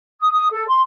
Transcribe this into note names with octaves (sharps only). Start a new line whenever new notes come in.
D#6
D#6
A4
C6